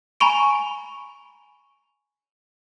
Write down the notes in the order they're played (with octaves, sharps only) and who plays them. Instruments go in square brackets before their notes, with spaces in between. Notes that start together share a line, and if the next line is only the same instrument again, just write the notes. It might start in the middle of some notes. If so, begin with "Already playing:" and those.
[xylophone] G#5 A#5 B5 C#6 D7